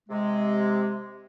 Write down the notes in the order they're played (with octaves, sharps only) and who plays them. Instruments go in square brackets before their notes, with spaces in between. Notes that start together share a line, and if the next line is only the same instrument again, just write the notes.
[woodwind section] C3 G#3